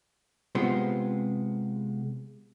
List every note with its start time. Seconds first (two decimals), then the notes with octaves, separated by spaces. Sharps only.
0.55 C3 G#3 B3 F4 C5